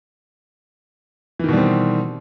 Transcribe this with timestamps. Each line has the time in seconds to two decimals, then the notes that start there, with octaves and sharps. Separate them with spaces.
1.39 E3
1.44 D#3
1.48 B2
1.53 G3
1.57 C4